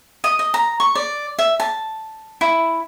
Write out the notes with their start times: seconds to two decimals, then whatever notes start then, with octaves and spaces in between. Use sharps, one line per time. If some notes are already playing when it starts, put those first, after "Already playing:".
0.24 D#5
0.39 D#5
0.54 A#5
0.80 C#6
0.95 D5
1.39 E5
1.60 A5
2.41 E4